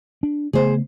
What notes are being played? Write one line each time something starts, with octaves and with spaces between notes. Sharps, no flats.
D4
C#3 A3 B3 G#4 C5